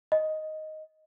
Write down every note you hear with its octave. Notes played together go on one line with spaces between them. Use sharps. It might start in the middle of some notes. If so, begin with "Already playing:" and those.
D#5